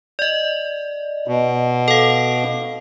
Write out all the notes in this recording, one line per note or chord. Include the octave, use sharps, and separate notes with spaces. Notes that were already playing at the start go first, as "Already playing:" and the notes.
D5 D#5
B2
A4 F5